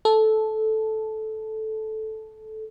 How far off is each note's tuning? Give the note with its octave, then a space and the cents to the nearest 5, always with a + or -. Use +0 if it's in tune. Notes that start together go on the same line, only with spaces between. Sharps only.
A4 -10